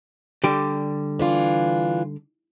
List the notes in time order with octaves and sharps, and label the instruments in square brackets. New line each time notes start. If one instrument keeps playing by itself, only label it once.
[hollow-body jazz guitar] D3 G3 G4
[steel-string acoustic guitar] E3 D4 F4